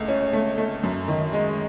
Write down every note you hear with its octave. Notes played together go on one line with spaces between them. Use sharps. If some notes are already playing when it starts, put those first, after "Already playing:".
Already playing: C#2 A3
C#4
A3
A3
F#2
D#3
G#3